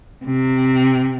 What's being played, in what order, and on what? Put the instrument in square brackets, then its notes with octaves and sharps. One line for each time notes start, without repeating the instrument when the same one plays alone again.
[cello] C3